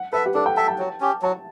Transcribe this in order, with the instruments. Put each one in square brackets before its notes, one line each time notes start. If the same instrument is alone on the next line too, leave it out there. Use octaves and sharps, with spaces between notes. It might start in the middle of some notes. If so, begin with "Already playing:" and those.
Already playing: [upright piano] F#5
[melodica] A4 E5 [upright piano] B4
[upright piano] G4
[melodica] D4 [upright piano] A4
[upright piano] G5
[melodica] A4 E5 [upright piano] A5
[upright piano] A5
[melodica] F#3
C#4 G4
[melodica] F#3 [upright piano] A5